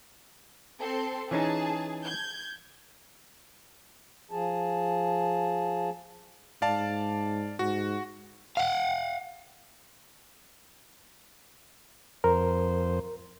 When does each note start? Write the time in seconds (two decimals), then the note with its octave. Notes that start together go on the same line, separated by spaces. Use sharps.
0.78 C4 A4 C6
1.31 E3 C#4 D#4 G#4 A5
2.04 G6 G#6
4.31 F3 G#4 A5
6.62 G#2 D5 F5 A5
7.59 G#2 F#4
8.57 F5 F#5
12.24 F2 A#4 C5